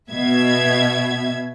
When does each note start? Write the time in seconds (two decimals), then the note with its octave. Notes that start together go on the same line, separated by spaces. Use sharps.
0.11 B2 E5 G#6